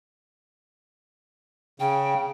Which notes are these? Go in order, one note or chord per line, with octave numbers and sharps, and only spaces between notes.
C#3 G5